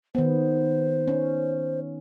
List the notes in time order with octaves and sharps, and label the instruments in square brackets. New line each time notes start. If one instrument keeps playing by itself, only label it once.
[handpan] D#3 B3 [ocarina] C5
[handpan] C#4